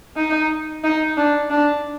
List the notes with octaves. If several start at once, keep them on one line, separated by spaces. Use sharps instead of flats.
D#4
D#4
D4
D4